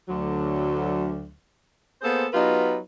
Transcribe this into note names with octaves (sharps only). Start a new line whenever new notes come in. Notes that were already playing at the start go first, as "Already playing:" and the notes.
D2 D3 F#3
A#3 B3 G#4 A4 C5
F#3 B3 D#4 F4 G4 B4